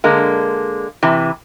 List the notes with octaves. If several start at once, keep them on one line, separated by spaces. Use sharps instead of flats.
D3 G#3 A#3
C3 E3